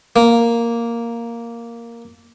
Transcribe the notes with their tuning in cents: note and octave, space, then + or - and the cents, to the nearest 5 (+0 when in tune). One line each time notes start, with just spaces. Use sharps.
A#3 +0